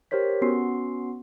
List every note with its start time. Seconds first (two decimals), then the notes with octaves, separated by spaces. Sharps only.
0.11 G4 A#4 C5 C#5 B6
0.41 B3 C#4 F#4 C6 C7